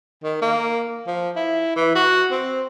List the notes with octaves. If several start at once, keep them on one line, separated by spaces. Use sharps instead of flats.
D#3
A#3
F3
E4
E3
F#4
C4